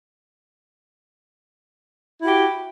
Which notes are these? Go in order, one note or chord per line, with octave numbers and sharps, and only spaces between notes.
E4 F#4 G4